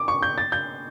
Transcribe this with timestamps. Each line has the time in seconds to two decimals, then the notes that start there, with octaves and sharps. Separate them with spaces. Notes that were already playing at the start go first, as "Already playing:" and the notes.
Already playing: D6
0.08 C#6
0.23 G6
0.38 A6
0.52 G6